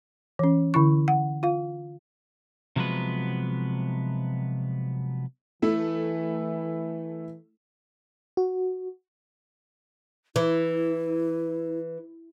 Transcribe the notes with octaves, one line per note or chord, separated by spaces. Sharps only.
E3 C#4
D3 E4 C#6
F#5
F4 F5
C3 F3 F#3 G#3 B3 B4
E3 A3 E4
F#4
E3 E4